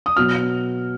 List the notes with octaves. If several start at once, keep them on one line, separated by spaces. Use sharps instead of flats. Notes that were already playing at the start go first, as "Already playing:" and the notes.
D#6
B2 F#3 F6